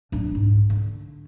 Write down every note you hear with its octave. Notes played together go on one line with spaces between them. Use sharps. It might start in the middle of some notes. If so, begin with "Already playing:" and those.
D1 D4
C2 G#2
D3